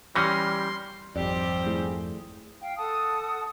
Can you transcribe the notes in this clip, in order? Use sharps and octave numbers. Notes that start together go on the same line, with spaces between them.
E3 G3 C#4 C6 F6 G6 A#6
G#1 F2 F3 G3 C4 G4 C5 D5
A3 E4 G#4
F5 G5
A4 F#5 A5 D#6